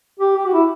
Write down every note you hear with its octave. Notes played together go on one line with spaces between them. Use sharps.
G4
G4
F#4
E4